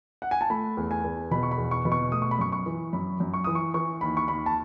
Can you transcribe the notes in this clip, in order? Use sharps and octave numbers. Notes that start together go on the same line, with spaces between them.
F#5
G#5
A5
A3 B5
E2
G#5
E2
B2 B5
C#6
B5
E2
C#6
B2 B5
C#6
A3 D#6
C#6
B5
F#2 C#6
C#6
E3
F#2 B5
F#2
C#6
E3 D#6
C#6
E3 C#6
D#2 B5
C#6
D#2 B5
A5